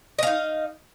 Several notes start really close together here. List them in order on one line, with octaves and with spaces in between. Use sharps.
D#5 F5 D#4